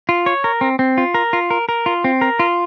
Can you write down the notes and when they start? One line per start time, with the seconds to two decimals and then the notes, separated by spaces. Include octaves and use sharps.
0.09 F4
0.26 C#5
0.44 A#4
0.61 C4
0.79 C4
0.98 F4
1.14 A#4
1.33 F4
1.50 A#4
1.69 A#4
1.86 F4
2.04 C4
2.21 A#4
2.39 F4